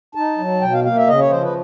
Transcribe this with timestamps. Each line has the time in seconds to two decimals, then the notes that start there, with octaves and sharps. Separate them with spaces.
0.15 D#4 A5
0.38 F#3
0.61 B2 G5
0.73 F5
0.84 A#3 F5
0.96 E5
1.07 C#3 D#5
1.19 C#5
1.30 F3 C5
1.42 B4